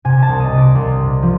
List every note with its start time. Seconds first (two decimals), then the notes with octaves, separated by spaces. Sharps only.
0.05 C3 G#5
0.22 A5
0.29 C2
0.40 D#5
0.52 C3
0.57 D5
0.75 C2
0.99 C3
1.23 F3